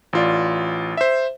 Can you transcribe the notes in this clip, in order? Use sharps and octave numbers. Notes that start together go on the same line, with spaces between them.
A1 F4 D5
C5 E5